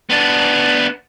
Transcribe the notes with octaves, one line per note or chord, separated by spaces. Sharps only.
B3 D4